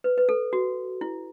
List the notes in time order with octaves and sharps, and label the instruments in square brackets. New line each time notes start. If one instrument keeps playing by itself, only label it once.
[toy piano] B4
B4
A4
F#4
E4